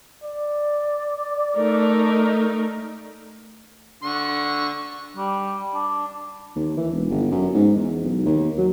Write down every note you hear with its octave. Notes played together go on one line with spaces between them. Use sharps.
D5
A3 D#4 A#4
D3 C#6
G3
D4
D#2
E3
E1
G1
F#2
G#2
E2
B1
D#2
F#3